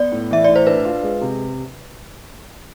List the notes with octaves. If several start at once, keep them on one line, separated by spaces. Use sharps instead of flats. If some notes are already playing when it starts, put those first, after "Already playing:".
Already playing: B3 D5
A2
E3 E5
A2 D5
C5
D4 B4
F4
G#3
C3